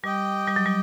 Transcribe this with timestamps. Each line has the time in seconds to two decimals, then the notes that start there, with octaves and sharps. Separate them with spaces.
0.04 G3 G4 D#5 G5
0.47 G3
0.56 F#3
0.66 G3